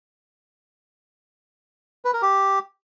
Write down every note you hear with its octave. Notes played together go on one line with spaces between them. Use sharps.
B4
A#4
G4